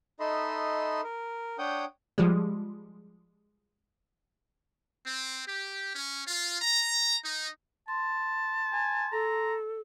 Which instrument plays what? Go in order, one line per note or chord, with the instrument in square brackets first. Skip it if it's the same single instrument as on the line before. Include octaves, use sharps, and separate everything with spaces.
[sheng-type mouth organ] D#4 A4 D#5 E5 B5 C6
A#4
D4 C#5 F#5 G5 D#6 G6
[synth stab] F3 G3 G#3
[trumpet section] C4
G4
C#4
F4
A#5
D#4
[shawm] A5 [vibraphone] C6
[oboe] G#5
[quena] A4 [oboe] A#5